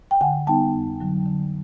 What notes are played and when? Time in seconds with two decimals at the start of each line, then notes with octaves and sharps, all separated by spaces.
0.11 G5
0.21 D3 F#5 G#5
0.47 G3 B3 D#4 G5 A5
0.74 F2
1.00 D3 F#3
1.26 D3